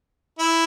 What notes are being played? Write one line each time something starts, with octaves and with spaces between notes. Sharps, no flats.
E4